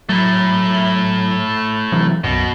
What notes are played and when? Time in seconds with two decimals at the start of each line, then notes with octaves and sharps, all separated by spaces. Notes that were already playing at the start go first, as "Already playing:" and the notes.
0.09 F#3 A3 E4
1.92 C3 E3 F#3
2.24 B1 F#2 B2